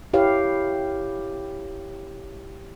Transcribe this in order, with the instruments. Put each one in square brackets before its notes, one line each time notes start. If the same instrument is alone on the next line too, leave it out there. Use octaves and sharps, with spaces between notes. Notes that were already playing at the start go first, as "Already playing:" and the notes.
[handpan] E4 G4 B4 C#5 F5